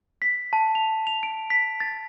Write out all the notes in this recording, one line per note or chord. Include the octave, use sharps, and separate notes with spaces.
B6
A5
F7
F7
D7
B6
A6